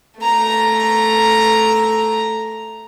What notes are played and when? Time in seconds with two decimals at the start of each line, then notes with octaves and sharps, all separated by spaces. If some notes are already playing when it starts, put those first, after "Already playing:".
0.19 A3 A#5